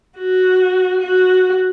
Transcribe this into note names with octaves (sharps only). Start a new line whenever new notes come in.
F#4
F#4